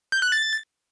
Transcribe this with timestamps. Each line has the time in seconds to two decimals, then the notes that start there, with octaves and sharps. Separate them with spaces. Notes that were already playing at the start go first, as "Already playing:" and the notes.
0.12 G6
0.22 F#6
0.32 A6